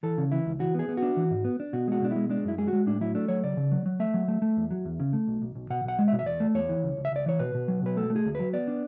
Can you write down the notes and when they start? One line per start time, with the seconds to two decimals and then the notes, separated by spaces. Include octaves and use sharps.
0.03 E3 A4
0.18 C#3
0.32 E3 E4
0.46 C#2
0.60 E3 F#4
0.74 B3 G#4
0.89 B3
0.97 F#4
1.02 D4
1.17 E3
1.31 G#2
1.44 B3
1.60 D4
1.73 B2 F#4
1.88 G#3 F#4
2.02 B2 D4
2.11 G#3 E4
2.29 G#3 D4
2.45 F#2 E4
2.58 G#3 G#4
2.68 F#4
2.73 G#3
2.86 A2 D4
3.01 F#3 E4
3.15 A3 D4
3.28 F#3 C#5
3.44 C#3 D5
3.57 C#3
3.72 F#3
3.86 F#3
4.00 A3 E5
4.14 F#3
4.28 A3
4.42 A3
4.57 E2
4.71 F#3
4.85 E2
5.00 C#3
5.13 A3
5.28 B1
5.42 B1
5.55 B1
5.70 B2 F#5
5.84 B1 F#5
5.99 G#3
6.08 E5
6.13 B2
6.19 E5
6.26 E2 D5
6.40 A3
6.55 E2 C#5
6.69 E3
6.83 C#2
6.97 C#2
7.05 E5
7.12 C#2 D5
7.26 E3 C#5
7.39 B2 B4
7.55 B2
7.68 F#3
7.82 B2 B4
7.97 A3 A4
8.10 A3
8.16 G#4
8.25 D2
8.35 F#3 B4
8.53 B3 D5
8.68 D4